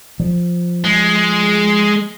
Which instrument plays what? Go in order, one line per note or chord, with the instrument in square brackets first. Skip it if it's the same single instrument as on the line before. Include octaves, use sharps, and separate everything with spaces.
[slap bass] F3
[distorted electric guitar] G#3